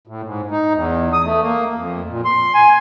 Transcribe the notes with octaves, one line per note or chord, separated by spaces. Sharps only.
A2
G#2
D#4
E2
D#6
A3
A#3
F2
A#2
C6
G#5